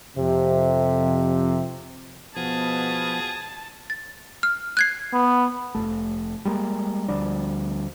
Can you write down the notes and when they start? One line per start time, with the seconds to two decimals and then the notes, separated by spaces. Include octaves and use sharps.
0.17 F2 C3
2.37 B2 F3 B3 G#4 A5
3.90 A6
4.43 F6
4.77 F#6 G#6 C7
5.13 B3
5.75 F1 E2 A3
6.45 G3 G#3 A#3
7.08 D2 F3 G3 D4